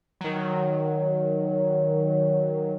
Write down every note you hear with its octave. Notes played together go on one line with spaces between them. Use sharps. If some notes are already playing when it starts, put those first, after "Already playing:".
D#3 F#3